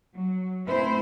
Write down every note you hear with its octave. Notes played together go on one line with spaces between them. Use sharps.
F#3
A3 C4 E4 C5